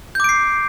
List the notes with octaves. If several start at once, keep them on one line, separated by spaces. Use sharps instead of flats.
D6 G6 C7 D7